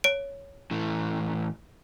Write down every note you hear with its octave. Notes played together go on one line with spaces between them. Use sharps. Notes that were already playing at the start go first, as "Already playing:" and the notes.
C#5 D7
A2 E3